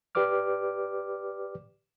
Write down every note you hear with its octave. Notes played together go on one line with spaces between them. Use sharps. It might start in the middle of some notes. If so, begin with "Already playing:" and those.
G4 B4 D5 D6 F6